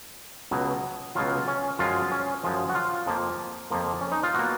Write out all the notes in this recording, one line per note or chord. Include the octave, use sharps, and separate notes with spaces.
C#2 B2 F#3
C#2 B2 F#3 F4
C#4
F#2 F3 G#3 F4
C#4
F#2 F3 G#3
F#4
F4
F2 F3 A#3
F2 F3 A#3
C#4
D#4
F4
B2 A#3 F#4